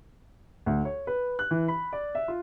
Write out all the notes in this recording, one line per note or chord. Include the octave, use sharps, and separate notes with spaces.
D2
C#5
B4
F#6
E3
B5
D5
E5
F4